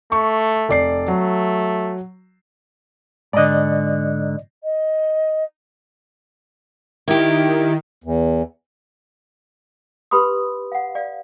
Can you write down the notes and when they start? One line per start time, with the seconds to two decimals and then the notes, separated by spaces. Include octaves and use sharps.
0.12 A3 C#6
0.69 F1 D5 C7
1.08 F#3 A3
3.33 G#2 D3 D5 D#5
4.63 D#5
7.08 D#3 E4 G4
8.04 E2
10.11 G4 B4 B5 C6 D#6
10.72 F5 F#5
10.95 D5 F5